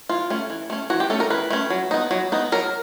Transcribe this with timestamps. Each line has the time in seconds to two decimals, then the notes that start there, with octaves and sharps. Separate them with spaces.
0.09 E3 F4
0.30 A3 C#4
0.50 E3
0.70 A3 C#4
0.90 E3 F#4
1.00 G4
1.10 A3 C#4 A4
1.20 A#4
1.30 E3 B4
1.50 A3 C#4
1.70 F#3
1.91 B3 D#4
2.11 F#3
2.32 B3 D#4
2.52 F#3 A#4